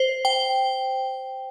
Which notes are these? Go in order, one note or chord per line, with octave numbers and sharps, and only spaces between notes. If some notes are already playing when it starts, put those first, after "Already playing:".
Already playing: C5
G5